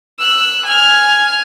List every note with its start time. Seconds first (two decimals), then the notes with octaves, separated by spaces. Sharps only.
0.19 E6 F#6
0.65 G#5 F6